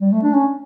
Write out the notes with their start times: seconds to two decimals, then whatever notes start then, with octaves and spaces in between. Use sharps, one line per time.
0.01 G3
0.12 A3
0.23 D4
0.34 C#4